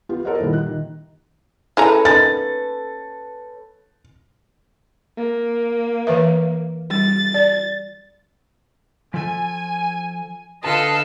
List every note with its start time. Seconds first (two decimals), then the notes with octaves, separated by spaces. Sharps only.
0.09 B3 F4 G4
0.25 A4 A#4 C5 C#5 D#5 F#5
0.40 A#2 D#3 G3 E4
0.53 F#6
0.66 D#3
1.77 C#4 E4 G#4 A4 B4 A#5
2.05 A#3 B3 D#4 A6
5.17 A#3
6.07 E3 B4 E5
6.91 G3 A6
7.34 D5
9.14 F3 A4 G#5
10.64 D3 F4 A4 B4 D#5 F5 A5